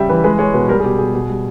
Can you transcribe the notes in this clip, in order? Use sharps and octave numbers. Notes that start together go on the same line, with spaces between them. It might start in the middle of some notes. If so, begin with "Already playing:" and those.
Already playing: C#3 G3 E5 G5
E3 B4
G#3 B4
G#3 C#5
B2 B4
G3 A#4
G#4
B2 G4
B2 G#4
B2
G3